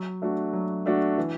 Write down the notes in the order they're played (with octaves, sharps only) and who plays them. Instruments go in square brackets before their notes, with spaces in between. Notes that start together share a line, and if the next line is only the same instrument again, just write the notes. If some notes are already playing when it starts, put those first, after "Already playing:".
Already playing: [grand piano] F#3
A3 D4 F#4
F#3
A3 D4 F#4
E3